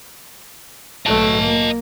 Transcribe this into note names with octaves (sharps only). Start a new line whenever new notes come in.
B1 A3 D#5 A5
A#3